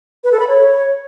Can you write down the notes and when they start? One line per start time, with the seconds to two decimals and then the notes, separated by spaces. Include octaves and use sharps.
0.24 B4
0.32 A4
0.40 B5
0.48 C#5